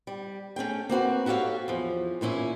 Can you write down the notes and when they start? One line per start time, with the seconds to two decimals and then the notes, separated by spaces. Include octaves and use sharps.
0.07 G3
0.56 A3 C#4 G#4 G5
0.89 A#3 C4 F#4 B4
1.26 F#4 G4 A4 C#5 F5
1.68 E2 F3
2.21 E2 A#2 C#4 E4